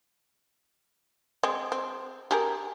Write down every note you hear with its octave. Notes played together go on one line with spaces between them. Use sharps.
G#3 C4
C4
G4 G#4 A#4